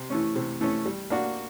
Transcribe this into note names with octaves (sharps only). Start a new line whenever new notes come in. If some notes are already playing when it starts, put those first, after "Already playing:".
Already playing: C3
E3 A3 C#4
C3
E3 A3 C#4
G3
A#3 D4 F#4